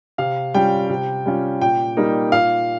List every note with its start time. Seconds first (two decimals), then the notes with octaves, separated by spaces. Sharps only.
0.18 C3 F5
0.54 G3 C#4 F4 G5
0.89 C3
1.26 G3 C#4 F4
1.61 A#2 G5
1.97 G3 A#3 D#4
2.32 A#2 F5